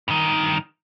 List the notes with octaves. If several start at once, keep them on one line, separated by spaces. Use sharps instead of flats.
G2 D#3